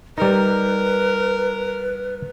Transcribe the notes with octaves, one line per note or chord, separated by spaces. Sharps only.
G3 D#4 A#4 B4